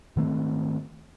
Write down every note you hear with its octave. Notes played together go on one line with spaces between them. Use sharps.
G#2 D#3 A3 C4